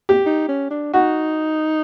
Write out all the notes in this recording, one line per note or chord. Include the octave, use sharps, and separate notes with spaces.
G4
D#4
C#4
D4
D#4 F#4